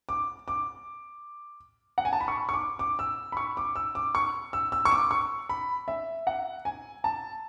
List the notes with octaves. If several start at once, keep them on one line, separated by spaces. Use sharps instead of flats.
D6
D6
F#5
G#5
A5
B5
C#6
C#6
D6
D6
E6
B5
C#6
D6
E6
D6
C#6
E6
E6
C#6
D6
C#6
B5
E5
F#5
G#5
A5